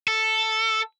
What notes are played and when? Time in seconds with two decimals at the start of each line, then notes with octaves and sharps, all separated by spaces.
0.08 A4